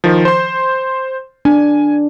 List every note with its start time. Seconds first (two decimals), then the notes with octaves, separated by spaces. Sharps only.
0.04 D#3 F3
0.25 C5 C6
1.45 D4 G#5